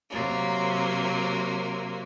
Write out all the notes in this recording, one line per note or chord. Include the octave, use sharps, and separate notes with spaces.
C3 F#3 A#3